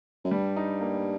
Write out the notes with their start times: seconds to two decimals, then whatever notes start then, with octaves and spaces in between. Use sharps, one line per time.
0.25 F#2
0.31 G2 G3
0.56 D#4
0.81 A#3